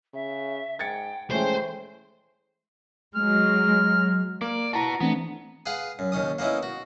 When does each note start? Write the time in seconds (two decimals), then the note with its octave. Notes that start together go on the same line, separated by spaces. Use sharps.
0.14 C#3 E5
0.79 G#2 G5 G#6 A6 C#7
1.31 E3 G#3 A3 C#4 C5 G5
3.16 F#3 G#3 F6
4.41 A#3 D5
4.73 E4 F#4 B4 A5 A#5
5.01 E3 A3 B3 C4 D4
5.66 G#4 B4 F5 F#5
5.99 F#2
6.12 D#2 D#3 C#4 D#6
6.39 A#3 B3 C#4 D#4 E4
6.63 F#4